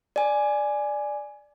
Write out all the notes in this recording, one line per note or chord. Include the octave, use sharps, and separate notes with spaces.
D5 G#5